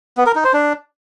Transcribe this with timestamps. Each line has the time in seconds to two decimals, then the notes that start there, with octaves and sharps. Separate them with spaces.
0.17 B3
0.26 A#4
0.35 D#4
0.44 C5
0.54 D4